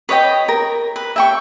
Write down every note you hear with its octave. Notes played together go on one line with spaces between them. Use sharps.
B4 C#5 D#5 G5
A#4
B4
E5 G5 C#6